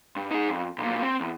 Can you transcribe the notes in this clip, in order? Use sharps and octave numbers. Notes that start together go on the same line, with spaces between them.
G2
D#4 G#4
F2
B1 A#2
C4
E2